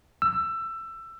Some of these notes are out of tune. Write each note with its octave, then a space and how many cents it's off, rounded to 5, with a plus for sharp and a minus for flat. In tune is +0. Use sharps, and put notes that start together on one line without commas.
E6 +20